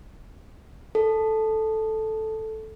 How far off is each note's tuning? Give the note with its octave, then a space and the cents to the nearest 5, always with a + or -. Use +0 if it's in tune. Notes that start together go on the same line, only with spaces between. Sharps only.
A4 -5